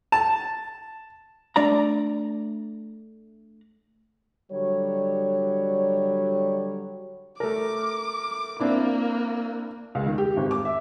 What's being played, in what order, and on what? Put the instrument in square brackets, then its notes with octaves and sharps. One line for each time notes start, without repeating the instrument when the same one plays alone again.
[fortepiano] A5
[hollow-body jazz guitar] A3 D4 D5 A#5
[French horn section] D3 F#3 G3 C#5
[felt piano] A3 A#4 [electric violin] D6
[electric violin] A#3 [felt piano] C4 D4 E4
[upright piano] C#2
D#3
G4
G#1
D6
E5